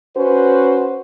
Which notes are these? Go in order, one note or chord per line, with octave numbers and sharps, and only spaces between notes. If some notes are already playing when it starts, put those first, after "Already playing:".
C#4 F#4 B4 C5